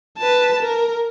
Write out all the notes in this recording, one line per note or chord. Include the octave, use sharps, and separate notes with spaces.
B4 A5
A#4